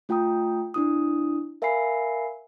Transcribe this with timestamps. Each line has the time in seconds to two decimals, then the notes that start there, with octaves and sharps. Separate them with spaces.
0.09 A3 F4 G5 A#5 D#6
0.74 D4 E4 D#6
1.62 A#4 E5 F5 G#5 B5 C7